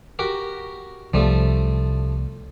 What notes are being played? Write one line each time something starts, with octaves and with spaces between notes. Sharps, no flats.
F#4 G4 A#4
C2 F3 G3 A3